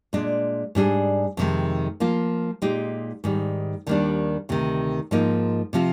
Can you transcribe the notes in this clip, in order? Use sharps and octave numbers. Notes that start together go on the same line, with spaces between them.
A#2 G#3 D4
G#2 G3 D4 G#4
F2 C3 D#3 G#3
F3 A#3 F4
A#2 G#3 D#4 G4
G#2 D#3 G3
D#2 D#3 G3 A#3 D4
D2 C3 D#3
G#2 F3 A#3 D#4
C3 F3 C4 F4